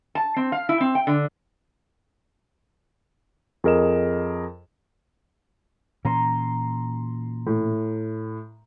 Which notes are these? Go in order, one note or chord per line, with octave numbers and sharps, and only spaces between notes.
A5
C4
F5
E4
C4
G5
D3
F2 G#4 A#4 D#5 E7
A#2 E3 C#4 A#5 C6 E6
A2